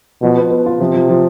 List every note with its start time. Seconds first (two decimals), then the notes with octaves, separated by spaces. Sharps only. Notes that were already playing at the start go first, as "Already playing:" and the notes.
0.22 B2 F3
0.37 B3
0.51 B3
0.66 F4
0.80 C3 F3
0.95 F3
1.09 F3